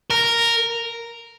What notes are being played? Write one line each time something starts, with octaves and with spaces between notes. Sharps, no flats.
A#4